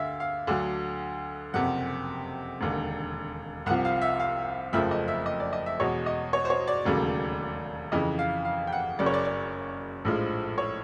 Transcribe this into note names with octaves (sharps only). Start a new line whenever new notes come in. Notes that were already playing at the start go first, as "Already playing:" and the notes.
Already playing: D2 D3 E5 F5
F5
D2 D3 F#3
F#1 F2 C3 F#5
E1 D#2 D3
C2 C3 F3 F#5
F5
E5
F5
F#1 F2 C#3 F3 A3 E5
D#5
E5
D#5
D5
D#5
E5
E2 B2 G#3 C#5
D#5
C#5
C5
C#5
D5
E1 D#2 C#3 F#3 A3
F2 C#3 E3 D#5
F5
F5
G5
F#5
F#1 F#2 C#3 D5
C#5
D5
D5
A#1 A2 F3 G#3
C#5